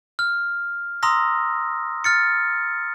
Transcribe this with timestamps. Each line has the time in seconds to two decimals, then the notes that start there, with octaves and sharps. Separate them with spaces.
0.19 F6
1.03 A#5 C6 D#6 E6 A#6
2.04 F6 A6 C#7